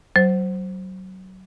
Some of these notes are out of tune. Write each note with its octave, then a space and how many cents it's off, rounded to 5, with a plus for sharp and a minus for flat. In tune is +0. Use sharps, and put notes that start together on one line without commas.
F#3 +25 C5 +0